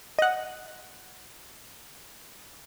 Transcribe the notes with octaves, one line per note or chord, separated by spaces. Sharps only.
D#5 F#5